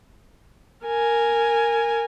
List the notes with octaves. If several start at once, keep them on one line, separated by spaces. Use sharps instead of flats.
A#4 G#5